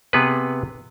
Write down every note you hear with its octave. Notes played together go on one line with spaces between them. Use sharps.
C3 B3 G#4 B4